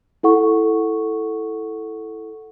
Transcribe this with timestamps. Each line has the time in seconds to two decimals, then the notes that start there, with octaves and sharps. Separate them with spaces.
0.23 E4 A4 F#5 C#6